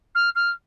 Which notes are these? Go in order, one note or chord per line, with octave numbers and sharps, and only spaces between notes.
F6
F6